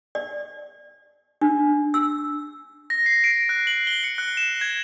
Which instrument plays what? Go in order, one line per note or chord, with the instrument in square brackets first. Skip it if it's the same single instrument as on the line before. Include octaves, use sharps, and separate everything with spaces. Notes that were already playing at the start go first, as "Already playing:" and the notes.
[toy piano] D5
D4
E6
[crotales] A#6
C7
D7
F#6
F#7
G7
C#7
F#6
E7
G#6